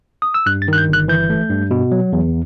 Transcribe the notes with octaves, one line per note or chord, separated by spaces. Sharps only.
D#6
E6
G2 F#6
A6
D#3 F#6
G6
G1 F#6
E3 G6
A3
G2
B2
F#3
E2